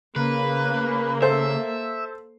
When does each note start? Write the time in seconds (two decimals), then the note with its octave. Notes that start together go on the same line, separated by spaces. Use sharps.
0.16 C#3 A#3 B4
1.22 A4 C5 E5